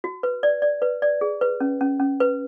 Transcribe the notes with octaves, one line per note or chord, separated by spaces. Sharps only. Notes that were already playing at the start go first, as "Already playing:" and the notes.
F#4
B4
D5
D5
B4
D5
G#4
B4
C#4
C#4
C#4
B4